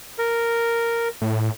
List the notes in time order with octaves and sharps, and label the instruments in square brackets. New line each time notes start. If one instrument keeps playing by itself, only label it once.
[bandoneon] A#4
[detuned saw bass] A2